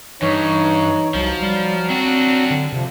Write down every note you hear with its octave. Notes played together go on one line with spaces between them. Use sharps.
G2 E3 D#4 C#5
C2 F3 F#3
G3
C4 D4 F#4
D3
C3 F3